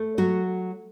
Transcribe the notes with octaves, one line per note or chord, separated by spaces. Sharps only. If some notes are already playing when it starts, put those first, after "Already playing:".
Already playing: A3
F#3 F#4